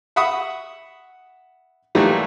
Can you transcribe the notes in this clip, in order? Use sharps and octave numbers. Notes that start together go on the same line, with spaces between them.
E5 F#5 B5 C#6 D#6
A#2 D#3 E3 F#3 G3 A3